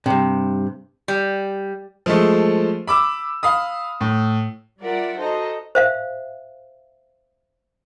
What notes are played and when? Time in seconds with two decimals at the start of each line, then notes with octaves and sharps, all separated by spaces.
0.06 G2 C3
1.08 G3
2.06 F3 G#3 A3
2.87 B5 D6 E6
3.43 F5 B5 D#6
4.01 A2
4.81 G3 F4 A#4 D5 E5 F#5
5.17 D#4 F#4 A4 C5 D#5 A#5
5.75 C5 E5 F5